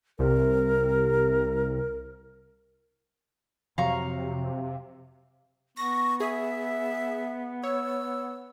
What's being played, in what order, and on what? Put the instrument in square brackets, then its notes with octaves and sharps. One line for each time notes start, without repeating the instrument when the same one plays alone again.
[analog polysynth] C2 C3 [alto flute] A#4
[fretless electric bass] F2 F#3 [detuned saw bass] C3 [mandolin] F5 A#5 C#6
[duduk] B3 [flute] C#6 [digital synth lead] A#6
[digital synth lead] G#4 [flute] E5
[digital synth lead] C#5 [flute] E6